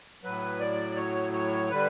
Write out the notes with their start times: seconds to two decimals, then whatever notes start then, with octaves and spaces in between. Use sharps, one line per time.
0.23 A2 F#3 B4
0.60 D5
0.96 C#5
1.33 C#5
1.70 D3 G3 B4